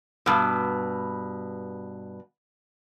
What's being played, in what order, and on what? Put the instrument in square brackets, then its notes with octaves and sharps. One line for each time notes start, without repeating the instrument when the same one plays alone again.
[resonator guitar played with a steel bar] G2 B2